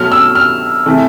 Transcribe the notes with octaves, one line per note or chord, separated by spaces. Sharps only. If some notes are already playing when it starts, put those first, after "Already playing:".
Already playing: B2 F#3 A3 F6
E6
F6
C3 E3 A3